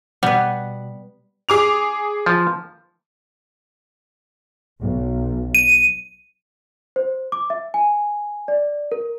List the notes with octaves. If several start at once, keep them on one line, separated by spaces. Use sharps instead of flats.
B2 G3 B3 F#5
G#4 D6 F7
F3
B1
D#7
C5
D6
E5
G#5
D5
A#4